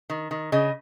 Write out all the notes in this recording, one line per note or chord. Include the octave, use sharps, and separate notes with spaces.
D#3
D#3
C#3 D#5